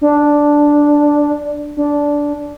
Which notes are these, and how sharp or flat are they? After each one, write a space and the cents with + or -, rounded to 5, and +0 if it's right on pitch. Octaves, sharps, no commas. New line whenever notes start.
D4 +0
D4 -10